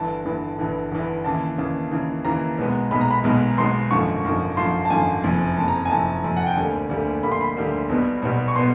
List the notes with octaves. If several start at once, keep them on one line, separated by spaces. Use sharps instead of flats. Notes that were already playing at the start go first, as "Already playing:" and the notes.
Already playing: G1 G2 E3 A5
G1 G2 E3
G1 G2 E3
G1 G2 E3
D#2 C#3 E3 A5
D#2 C#3 E3
D#2 C#3 E3
D#2 C#3 E3 A#5
B1 B2 G#3 B3
B1 B2 G#3 B3 B5
A#5
B5
B1 B2 G#3 B3
B1 B2 G#3 B3 C6
G#1 F#2 D3 F3 C#6
G#1 F#2 D3 F3
G#1 F#2 D3 F3 C6
A5
G#1 F#2 D3 F3 G#5
F#1 F2 C3
F#1 F2 C3 A5
A#5
G#5
F#1 F2 C3 A5
F#1 F2 C3
F#5
G5
D2 D3 G3 A#3 G#5
D2 D3 G3 A#3
D2 D3 G3 A#3 B5
C6
B5
D2 D3 G3 A#3
B1 B2 G3 B3
B1 B2 G3 B3
C#6
B2 G3 B3 C6